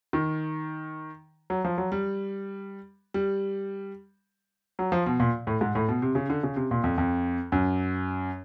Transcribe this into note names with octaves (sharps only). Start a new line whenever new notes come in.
D#3
F#3
F3
F#3
G3
G3
F#3
F3
B2
A#2
A2
G#2
A2
B2
C3
C#3
D3
C#3
C3
A#2
F2
F2
F#2